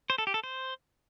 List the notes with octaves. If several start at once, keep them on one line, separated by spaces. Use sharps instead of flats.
C5
A4
G4
A4
C5